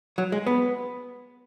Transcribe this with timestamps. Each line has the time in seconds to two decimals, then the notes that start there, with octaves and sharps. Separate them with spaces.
0.18 F#3
0.32 G#3
0.46 B3